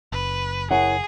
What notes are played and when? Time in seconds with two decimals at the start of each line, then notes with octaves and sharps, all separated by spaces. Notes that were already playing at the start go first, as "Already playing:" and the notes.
0.12 F#1 B4
0.71 E4 G#4 A#4 C#5 F#5